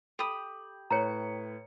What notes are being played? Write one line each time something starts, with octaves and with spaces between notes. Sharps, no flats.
G4 A4 B5 D#6
A2 B4 C#5 A#5 C#7